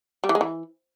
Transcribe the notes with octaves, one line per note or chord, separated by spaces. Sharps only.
G3
E3
G#3
E3